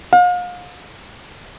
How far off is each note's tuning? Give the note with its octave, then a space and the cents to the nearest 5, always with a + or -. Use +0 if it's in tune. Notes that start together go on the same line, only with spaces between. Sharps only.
F5 +40